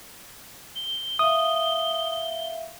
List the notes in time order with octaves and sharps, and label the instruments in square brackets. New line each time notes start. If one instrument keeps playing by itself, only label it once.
[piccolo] G7
[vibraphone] E5 F5 [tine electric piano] D#6